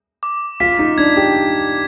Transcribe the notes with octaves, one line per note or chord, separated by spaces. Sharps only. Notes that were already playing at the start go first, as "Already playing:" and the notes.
D6
F4 B6
D#4
D4 G#6
G4